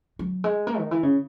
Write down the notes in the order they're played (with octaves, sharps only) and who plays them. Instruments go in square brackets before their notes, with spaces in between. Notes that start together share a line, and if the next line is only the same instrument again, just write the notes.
[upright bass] F#3
G#3
A#3
D#3
E3
C#3